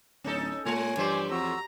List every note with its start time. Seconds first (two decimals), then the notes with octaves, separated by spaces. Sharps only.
0.24 D1 C#4 D#4 A4
0.65 A#2 G#3 C#5 G#5
0.97 G2 E3 A3 G4 C5 D5
1.31 F2 F#4 A#5 E6